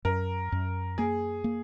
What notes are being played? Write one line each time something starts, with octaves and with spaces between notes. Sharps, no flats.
F#2 A#4
F#2
A#3 G#4
A#3